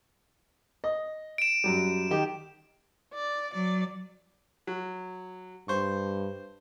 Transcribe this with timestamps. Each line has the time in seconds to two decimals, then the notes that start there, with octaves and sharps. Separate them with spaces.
0.84 D#5
1.38 D7 E7
1.64 F#2 F#3 G3
2.11 D#3 G4
3.14 D5
3.53 F#3 D5
4.67 F#3
5.68 G2 C5 C#6